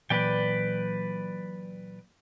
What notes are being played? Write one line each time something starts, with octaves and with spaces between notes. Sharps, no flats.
A#2 E3 F#3 B4 D5 G5